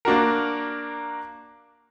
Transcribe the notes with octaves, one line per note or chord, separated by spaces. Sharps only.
A#3 D4 F#4 A#4